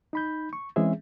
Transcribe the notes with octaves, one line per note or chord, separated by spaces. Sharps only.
D#4 B5 G6
C#6
E3 G#3 C4 C#4 G#4 E5